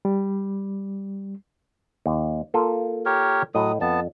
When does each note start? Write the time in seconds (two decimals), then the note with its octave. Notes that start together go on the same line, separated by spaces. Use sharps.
0.05 G3
2.06 D#2
2.54 A#3 F4 A4
3.06 G4 A#4 C#5
3.55 A2 F#3 D#5 D#6
3.81 F2 B3 A5